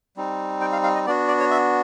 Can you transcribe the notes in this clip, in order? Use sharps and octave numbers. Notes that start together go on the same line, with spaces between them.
G3 C4 D#4
G5
F5
F5
D#5
B3 D4 F#4 D5
D5
C#5
E5